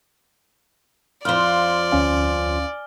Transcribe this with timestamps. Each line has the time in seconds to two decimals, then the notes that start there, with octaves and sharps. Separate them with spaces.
1.25 F2 F3 D5 F6 G7
1.92 D2 C#4 F5 G#5